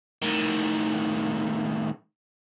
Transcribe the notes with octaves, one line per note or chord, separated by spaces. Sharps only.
A2 D#3